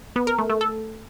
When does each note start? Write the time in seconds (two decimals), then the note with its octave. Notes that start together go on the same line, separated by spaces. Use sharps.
0.16 B3
0.27 A#4
0.38 A3
0.50 A3
0.61 A4